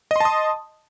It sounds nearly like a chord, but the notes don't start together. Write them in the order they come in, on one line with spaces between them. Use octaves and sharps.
D#5 C6 A5 D#6